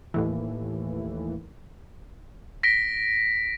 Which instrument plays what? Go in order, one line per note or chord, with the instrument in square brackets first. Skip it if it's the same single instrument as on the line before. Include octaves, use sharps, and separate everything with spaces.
[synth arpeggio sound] D#2 A2 E3
[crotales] A#6 B6 D7